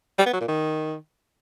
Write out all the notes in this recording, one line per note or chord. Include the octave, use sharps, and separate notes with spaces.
G3
B3
F#3
A#2
D#3